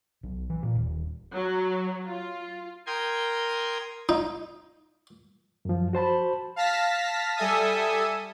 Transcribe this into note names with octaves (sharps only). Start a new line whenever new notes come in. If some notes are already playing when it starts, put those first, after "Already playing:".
B1
E3
A#2
D#1
F#3
F4
A#4 G5 C6 D#6 G#6
D#4
F#2 F3
F#4 C5 A5 B5
F5 A5 A#6 B6
G3 A4 E5 G#5 D#6